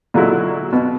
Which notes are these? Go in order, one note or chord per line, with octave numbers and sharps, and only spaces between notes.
A#2 D3 F#3 G#3 E4 F#4
B2